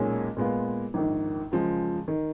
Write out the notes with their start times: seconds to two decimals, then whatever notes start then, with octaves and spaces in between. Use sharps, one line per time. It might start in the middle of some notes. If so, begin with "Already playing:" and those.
Already playing: B1 A#2 G#3 C#4 G#4
0.37 A#2 G#3 B3 F4
0.94 A#1 G#2 D#3
1.51 F#2 C#3 F3 G#3
2.08 D#3